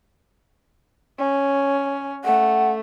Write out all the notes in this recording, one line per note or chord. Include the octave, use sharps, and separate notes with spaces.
C#4
A3 F#5